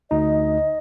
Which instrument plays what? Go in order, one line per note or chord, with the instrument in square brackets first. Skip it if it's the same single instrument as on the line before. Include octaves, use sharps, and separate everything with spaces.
[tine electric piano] D2 D#4 [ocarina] D#5